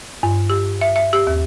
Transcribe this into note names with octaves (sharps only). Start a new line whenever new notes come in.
G2
G4
E5
E5
G4
D#2